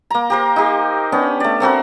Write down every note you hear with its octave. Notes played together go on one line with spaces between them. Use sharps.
A#3 A#5
G4 A#4 C5
D#4 G4
B3 C#4 D4
A3 D5
A3 C4 F#4 A#4